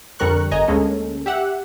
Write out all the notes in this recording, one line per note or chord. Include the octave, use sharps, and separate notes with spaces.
F2 D3 G3 A#4 C#6 F#6
G1 D#5 G#5 A#5
D2 G#3 A#3 C#4 A4
G4 E5 F#5